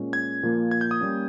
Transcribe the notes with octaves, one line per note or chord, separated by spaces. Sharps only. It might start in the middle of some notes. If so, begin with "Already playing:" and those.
Already playing: A#2 G#3 C#4
G#6
A#2 F3 A#3
G#6
G6
D#6
G3 A#3 C#4